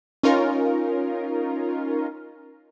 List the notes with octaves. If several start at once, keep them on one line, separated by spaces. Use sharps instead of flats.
C#4 D#4 F4 A#4